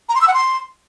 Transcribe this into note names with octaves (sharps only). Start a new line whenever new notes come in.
A#5
C6
E6
F#5
C6